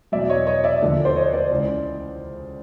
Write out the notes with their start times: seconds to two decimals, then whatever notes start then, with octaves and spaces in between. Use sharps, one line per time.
0.12 E2 B2 F#3 D5 E5
0.29 C#5 D#5
0.47 C#5 D#5
0.64 D5 E5
0.82 D#2 D3 F3
1.05 C5 D5
1.16 C#5 D#5
1.33 C5 D5
1.51 C#2 C#3 E3